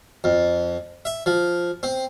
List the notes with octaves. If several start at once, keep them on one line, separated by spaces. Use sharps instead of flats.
F2
E5
F3
C4